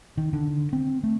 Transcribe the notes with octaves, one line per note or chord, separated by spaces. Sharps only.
D#3
D3
C4
A3